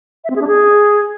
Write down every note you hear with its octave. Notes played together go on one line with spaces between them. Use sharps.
E5
C4
G#4
D4
G#4